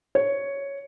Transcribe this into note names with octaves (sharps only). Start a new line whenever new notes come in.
C#5